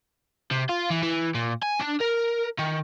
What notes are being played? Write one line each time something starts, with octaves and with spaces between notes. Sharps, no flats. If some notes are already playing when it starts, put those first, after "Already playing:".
C3
F4
E3
E3
A#2
G#5
D4
A#4
D#3